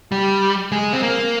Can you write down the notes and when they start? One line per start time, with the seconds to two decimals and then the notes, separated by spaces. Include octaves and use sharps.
0.12 G3
0.72 G#3
0.93 C4
1.03 A#3